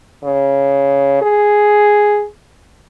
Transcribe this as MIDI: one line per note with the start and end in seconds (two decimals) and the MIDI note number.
0.24 1.19 49
1.22 2.25 68